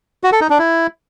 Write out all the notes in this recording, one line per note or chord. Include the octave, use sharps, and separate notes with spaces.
F#4
A4
D#4
D4
E4